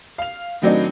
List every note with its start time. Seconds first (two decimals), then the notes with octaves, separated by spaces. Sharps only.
0.18 F5 F7
0.62 A2 D#3 F#3 C4 D4 D#4